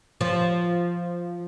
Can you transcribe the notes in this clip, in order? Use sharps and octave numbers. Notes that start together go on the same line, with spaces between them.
F3